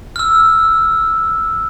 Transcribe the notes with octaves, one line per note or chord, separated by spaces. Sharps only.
E6 F6